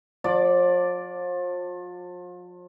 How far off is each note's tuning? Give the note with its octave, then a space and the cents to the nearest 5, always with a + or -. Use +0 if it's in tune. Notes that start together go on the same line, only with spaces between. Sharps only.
F3 +40 D5 +0